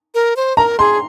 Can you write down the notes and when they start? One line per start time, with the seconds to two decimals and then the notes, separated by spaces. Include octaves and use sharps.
0.15 A#4
0.37 C5
0.57 A#4 A#5
0.79 G#4 C6